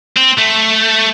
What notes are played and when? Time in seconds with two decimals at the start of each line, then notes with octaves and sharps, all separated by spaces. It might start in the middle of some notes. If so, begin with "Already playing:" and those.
0.17 C4
0.38 A3